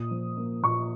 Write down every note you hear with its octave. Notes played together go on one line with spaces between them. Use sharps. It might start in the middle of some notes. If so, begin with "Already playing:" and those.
Already playing: A#2 D#6
F3
A#3
A#2 C#6